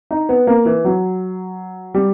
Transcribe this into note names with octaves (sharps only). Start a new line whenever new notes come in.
D#4
B3
A#3
E3
F#3
G3